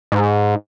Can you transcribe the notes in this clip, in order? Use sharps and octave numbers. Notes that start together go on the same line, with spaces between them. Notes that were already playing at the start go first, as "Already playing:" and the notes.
G#2